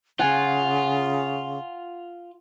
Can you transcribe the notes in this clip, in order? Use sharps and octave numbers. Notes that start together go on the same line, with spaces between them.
C#3 F4 F#5 G#5